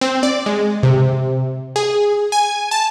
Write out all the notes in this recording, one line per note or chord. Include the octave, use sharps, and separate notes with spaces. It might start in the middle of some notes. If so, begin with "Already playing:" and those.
C4
D5
G#3
C3
G#4
G#5
A5